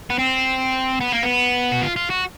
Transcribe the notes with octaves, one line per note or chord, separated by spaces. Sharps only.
B3
C4
B3
A#3
B3
F#4
F4
F4
F#4